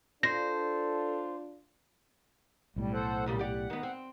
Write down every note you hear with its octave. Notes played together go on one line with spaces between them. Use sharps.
D4 F4 A4 C5 A#6
B1 A2 G3
A4 C5 F#5
A#2 C#3 G3
G4 D5 F#5
D#3 B3
C4